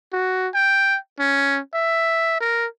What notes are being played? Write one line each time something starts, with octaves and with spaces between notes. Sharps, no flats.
F#4
G5
C#4
E5
A#4